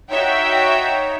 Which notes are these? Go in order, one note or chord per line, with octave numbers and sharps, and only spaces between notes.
D#4 F#4 C#5 E5 G5